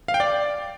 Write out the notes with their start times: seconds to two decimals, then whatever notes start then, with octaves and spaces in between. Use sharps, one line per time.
0.08 F5
0.14 G5
0.20 D5